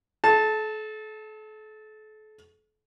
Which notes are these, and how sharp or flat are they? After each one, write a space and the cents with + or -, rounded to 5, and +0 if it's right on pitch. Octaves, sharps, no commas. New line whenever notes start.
A4 -40 A5 +0